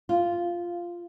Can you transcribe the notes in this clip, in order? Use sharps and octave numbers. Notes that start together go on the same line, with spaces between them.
F4